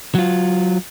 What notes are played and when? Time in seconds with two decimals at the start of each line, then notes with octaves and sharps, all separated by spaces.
0.15 F#3 F4